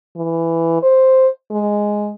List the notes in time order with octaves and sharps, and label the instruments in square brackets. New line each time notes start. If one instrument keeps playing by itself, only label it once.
[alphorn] E3
C5
G#3